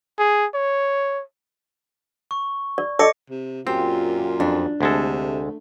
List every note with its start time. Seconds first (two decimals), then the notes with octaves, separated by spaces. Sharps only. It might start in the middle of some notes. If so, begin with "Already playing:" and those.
0.19 G#4
0.54 C#5
2.31 C#6
2.78 D5
2.99 A4 D5 D#5 D6 A#6 C#7
3.30 C3
3.67 F#2 A#2 C4 F4 G4
4.40 F2 D4
4.81 D2 C3 G#3 A3 A4